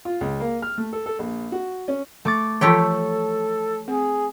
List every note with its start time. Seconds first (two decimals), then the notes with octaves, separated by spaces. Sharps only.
0.05 F4
0.21 C#2
0.40 A#3
0.62 F6
0.78 A3
0.93 A4
1.06 A4
1.19 A#1
1.52 F#4
1.88 C#4
2.25 A3 D6 A6
2.61 E3 F3 A3 F4 G4 A4 C#5 G5
3.88 C4 G#4